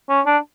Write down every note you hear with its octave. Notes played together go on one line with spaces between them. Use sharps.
C#4
D4